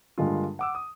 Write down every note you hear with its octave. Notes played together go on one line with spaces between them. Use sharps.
G2 D3 G3 G#3 A#3 F4
F#5 D6 E6
D#6